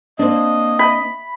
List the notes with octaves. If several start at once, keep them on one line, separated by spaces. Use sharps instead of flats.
A#3 C4 D4 D#5
B5